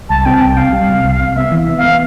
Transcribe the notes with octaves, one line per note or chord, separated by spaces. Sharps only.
C2 A5
C4 G5
A5
C2 G5
C4 F5
G3
C3
C2
C3
B3 E5
E3
B3
F5
B3